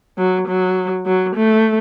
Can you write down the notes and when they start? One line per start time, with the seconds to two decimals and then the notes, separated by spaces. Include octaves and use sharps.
0.18 F#3
0.47 F#3
1.06 F#3
1.35 A3